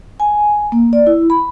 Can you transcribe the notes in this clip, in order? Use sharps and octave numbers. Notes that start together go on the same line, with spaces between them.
G#5
A#3
D5
E4
B5